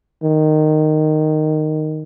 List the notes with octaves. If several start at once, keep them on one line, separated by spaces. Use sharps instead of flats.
D#3